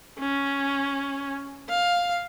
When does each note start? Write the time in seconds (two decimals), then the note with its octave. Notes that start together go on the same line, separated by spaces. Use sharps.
0.19 C#4
1.69 F5